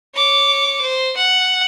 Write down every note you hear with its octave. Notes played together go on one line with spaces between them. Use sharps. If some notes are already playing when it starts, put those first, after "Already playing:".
C#5 D6
C5
F#5